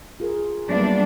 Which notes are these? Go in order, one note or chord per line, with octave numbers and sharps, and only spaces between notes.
F4 G#4 A#4
F#3 G3 A#3 B3 D4 E5